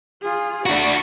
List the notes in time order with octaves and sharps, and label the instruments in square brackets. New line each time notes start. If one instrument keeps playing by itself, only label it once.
[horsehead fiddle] F4 G#4
[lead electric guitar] D4 F#4 [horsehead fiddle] D5 B5